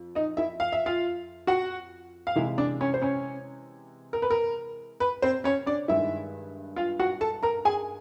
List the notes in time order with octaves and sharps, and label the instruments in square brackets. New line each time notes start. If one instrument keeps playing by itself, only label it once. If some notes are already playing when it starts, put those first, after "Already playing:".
Already playing: [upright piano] F2
D#4 D#5
E4 E5
F5
E5
F4 F5
F#4 F#5
F5
C3 E3 G#3 E4 E5
D4 D5
C#4 C#5
C5
C#4 C#5
A#4
B4
A#4
B4
C4 C5
C#4 C#5
D4 D5
G2 D#3 G#3 E4 E5
F4 F5
F#4 F#5
A4 A5
A#4 A#5
G#4 G#5